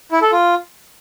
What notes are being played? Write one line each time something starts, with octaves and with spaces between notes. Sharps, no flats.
E4
A4
F4